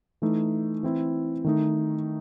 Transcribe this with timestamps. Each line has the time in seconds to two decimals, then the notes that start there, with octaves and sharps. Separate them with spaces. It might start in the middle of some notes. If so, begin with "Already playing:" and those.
0.22 E3 A3 D#4
0.83 E3 C4 E4
1.44 D#3 A3 D#4